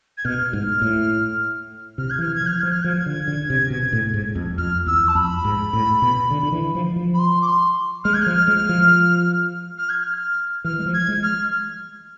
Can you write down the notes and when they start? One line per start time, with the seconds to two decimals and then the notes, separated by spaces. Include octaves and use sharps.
0.17 G#6
0.25 B2 F6
0.53 G#2
0.82 A2
1.98 C3 F6
2.10 G#6
2.19 E3
2.21 F6
2.34 G#6
2.41 F3
2.46 F6
2.59 F3 G#6
2.71 F6
2.84 F3 G#6
3.06 D3
3.28 D3
3.50 C3
3.70 B2
3.93 A2
4.14 G#2
4.35 F2
4.57 F2 F6
4.86 E2 E6
5.07 A5
5.15 F2 B5
5.45 G#2
5.73 A2
6.02 B2
6.31 D3
6.43 D3
6.52 E3
6.75 F3
6.96 F3
7.14 B5
7.18 C6
7.41 D6
7.47 C6
8.04 G#3 F6
8.14 G#6
8.22 F3 F6
8.48 G#3
8.69 F3
9.78 F6
9.89 G#6
10.00 F6
10.64 E3 F6
10.79 G#3
10.86 F3
10.93 G#6
11.08 G#3
11.22 F6